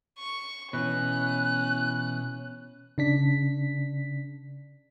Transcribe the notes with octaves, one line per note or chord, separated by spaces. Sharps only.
C#6
B2 E3 C#4 F#6
C#3 D4 B6